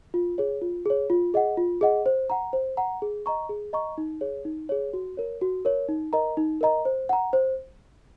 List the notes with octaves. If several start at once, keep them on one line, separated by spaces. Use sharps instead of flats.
F4
G#4 C#5
F4
G#4 C#5
F4
G#4 D#5 F#5
F4
G#4 D#5 F#5
C5
F#5 A#5
C5
F#5 A#5
G#4
D#5 A#5 C#6
G#4
D#5 A#5 C#6
D#4
G#4 C#5
D#4
G#4 C#5
F#4
A#4 C#5
F#4
A#4 C#5
D#4
A#4 D#5 A#5
D#4
A#4 D#5 A#5
C5
F#5 A#5
C5